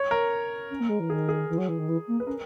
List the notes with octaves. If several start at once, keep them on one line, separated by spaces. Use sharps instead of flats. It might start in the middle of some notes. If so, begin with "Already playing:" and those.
Already playing: C#5
A#4
C#4
A#3
G#3
E3
D#3 G#4
G#4
E3
F#3
E3
D#3
E3
A#3
B4
C#4 A#4